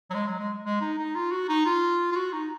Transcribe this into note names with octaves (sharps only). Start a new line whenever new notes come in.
F#3
G#3
F#3
G#3
G#3
D#4
D#4
F4
F#4
D#4
F4
F4
F#4
D#4